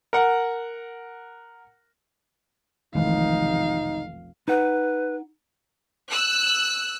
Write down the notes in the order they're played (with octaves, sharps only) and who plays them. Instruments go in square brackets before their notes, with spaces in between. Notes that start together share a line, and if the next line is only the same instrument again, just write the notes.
[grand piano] A#4 F#5
[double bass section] F1 B1 [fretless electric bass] D#3 E3 G#3 [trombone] D#4 [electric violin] F5
[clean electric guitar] D#4 F#5 [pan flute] B4
[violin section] E6 F#6